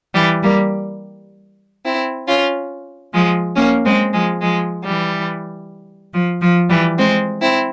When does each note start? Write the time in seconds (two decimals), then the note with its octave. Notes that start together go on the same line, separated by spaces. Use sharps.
0.14 E3 G3
0.42 G3 A#3
1.85 C4 E4
2.28 C#4 F4
3.13 F3 G#3
3.56 A#3 C#4
3.85 G#3 C4
4.13 F3 G#3
4.41 F3 G#3
4.85 E3 G3
6.13 F3
6.41 F3
6.69 E3 G3
6.98 G#3 C4
7.41 C4 E4